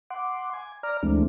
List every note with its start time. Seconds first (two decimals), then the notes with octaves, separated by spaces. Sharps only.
0.10 F#5 C6 D6
0.53 G#5
0.83 D5 A#5 F6
1.03 D2 E3 G#3 A3 C4 D4